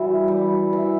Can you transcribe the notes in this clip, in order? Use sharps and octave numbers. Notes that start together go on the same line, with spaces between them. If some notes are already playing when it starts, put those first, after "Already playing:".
Already playing: E3 G3 F#4
G3
E3